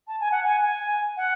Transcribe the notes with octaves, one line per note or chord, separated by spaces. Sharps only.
A5
G#5
F#5
G#5
G#5
F#5